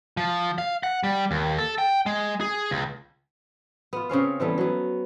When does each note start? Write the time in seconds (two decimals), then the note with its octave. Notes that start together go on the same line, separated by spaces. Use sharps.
0.17 F3
0.58 F5
0.83 F#5
1.03 G3
1.31 D#2
1.59 A4
1.78 G5
2.06 G#3
2.41 G#4
2.71 C#2
3.93 B3 F4
4.09 C#3 C4 C#4 F5
4.40 E3 G3 B3 A4
4.58 F#3 B3